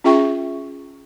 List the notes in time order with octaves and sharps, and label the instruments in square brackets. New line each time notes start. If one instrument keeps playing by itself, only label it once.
[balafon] C#4 F4 G#4 E5 G5 C#6